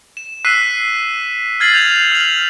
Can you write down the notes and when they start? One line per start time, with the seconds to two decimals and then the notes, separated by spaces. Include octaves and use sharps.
0.17 E7
0.45 E6 F#6 B6 C7 D#7
1.60 F6 G#6 A6 C7 F#7
1.74 G6 G#6 F7
2.12 F6 F7 F#7